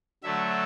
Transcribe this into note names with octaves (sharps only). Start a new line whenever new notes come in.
D3 F#3 A3 E5